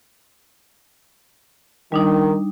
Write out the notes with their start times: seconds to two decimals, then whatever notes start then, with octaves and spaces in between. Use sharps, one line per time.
1.92 D#3 G3 D4 D#4